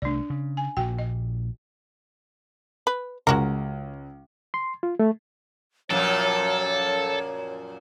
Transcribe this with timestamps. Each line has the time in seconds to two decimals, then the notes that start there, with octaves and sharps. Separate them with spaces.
0.02 C2 A3 D4 D5
0.30 C#3
0.57 G#5
0.77 A#1 A#2 F#4 G5
0.99 D#5
2.87 B4
3.27 C#2 G#3 F#4 A#4
4.54 C6
4.83 F4
4.99 A3
5.90 F#2 A#2 F3 A4 C#5